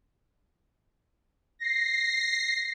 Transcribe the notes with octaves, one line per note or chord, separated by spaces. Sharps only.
A#6 C7